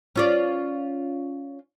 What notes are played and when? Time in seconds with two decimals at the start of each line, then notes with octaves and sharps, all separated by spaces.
0.16 C#4 F4 D5